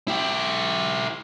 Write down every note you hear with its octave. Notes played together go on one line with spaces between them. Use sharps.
E4 G4